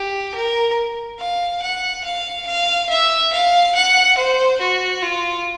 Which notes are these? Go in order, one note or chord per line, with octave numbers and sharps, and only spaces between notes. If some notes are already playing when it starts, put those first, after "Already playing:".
Already playing: G4
A#4
F5
F#5
F5
F5
E5
F5
F#5
C5
F#4
F4